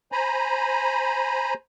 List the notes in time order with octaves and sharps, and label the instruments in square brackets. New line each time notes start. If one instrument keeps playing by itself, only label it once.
[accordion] C5 G#5 A#5 B5